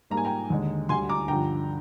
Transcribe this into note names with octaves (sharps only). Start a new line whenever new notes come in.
G#2 G3 A#3 A#5
G#5
G5 A#5
D#2 D3 G#3
D2 D3 G3 G#5 C6
A#5 D6
G2 D3 F3 G5 A#5